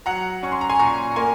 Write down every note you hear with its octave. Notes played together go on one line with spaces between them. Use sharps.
F#3 F#5 A#5
C#4 C#6
C6
A#5
G#5 C6
A#2 A#5 C#6
A#5
A#3 G#5 C6